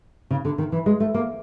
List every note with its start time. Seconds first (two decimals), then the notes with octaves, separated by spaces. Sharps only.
0.31 C#3
0.45 D3
0.58 D#3
0.72 E3
0.86 G#3
1.00 A3
1.14 A#3